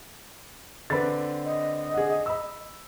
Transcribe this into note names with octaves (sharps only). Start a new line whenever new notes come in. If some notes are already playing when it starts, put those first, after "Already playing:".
D3 C4 D4 B4 B5 A6
D#5
G#4 F#5
B5 E6